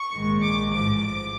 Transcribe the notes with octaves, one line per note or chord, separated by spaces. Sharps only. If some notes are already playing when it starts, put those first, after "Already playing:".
Already playing: C#6
A#1 G#2 D#3 G#3
D6
A1 G#2 F3 D6
D6